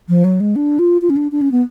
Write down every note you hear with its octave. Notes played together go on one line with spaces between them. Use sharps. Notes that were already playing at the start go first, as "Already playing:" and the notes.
F3
F#3
G#3
D4
F4
F4
C#4
D4
D4
C#4
B3